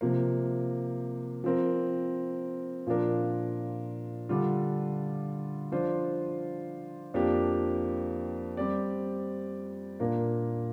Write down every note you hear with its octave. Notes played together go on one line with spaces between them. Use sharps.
C3 F3 A#3
F3 C4 A#4
A#2 F3 D4 A#4
D3 G3 D4 F4
F3 D4 F4 C5
F2 F3 A#3 D4 G4
G3 C4 G4 D5
A#2 A#3 D4 A#4